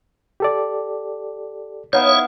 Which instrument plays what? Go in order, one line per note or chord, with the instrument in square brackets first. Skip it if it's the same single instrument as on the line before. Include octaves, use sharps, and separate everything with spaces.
[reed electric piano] G4 A4 D5
[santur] B3 D#4 F5 [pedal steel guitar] E4 D#6 G6 [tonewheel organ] C#5